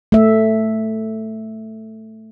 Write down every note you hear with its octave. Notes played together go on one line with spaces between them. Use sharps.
A3 E5